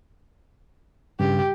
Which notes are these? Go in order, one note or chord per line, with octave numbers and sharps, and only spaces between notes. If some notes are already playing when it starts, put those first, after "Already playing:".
G2 C#3 G4